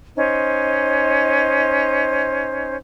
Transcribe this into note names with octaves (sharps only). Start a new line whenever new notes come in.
C#4 D#4 C5